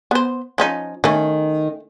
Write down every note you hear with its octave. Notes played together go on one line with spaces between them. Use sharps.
B3 C5
F3 C#4 D#4
D#3 A3 C#4